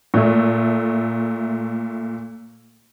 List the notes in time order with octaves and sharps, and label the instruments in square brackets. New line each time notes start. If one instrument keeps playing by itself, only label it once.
[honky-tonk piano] A#2 A3